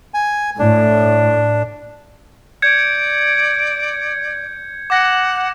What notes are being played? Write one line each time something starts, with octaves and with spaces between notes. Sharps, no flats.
G#5
A2 D4
D5 G6 G#6 C#7
F#5 D6 A#6